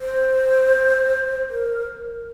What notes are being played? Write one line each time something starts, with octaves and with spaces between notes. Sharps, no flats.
C5
A#4